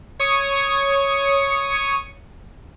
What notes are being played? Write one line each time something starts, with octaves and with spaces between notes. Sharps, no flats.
C#5 C#6 D#6 C#7